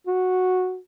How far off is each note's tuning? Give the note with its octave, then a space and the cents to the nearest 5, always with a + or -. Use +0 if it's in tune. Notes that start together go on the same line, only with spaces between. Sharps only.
F#4 -10